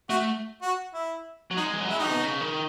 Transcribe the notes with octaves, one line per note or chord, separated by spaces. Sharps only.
A3 F#4
F#4
E4
F#3
G#3 D#4
E3
F#3
G#3 E4
D#4
B2
C#3
D#3